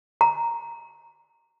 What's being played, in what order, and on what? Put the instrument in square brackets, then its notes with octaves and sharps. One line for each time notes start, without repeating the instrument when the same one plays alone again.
[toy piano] A#5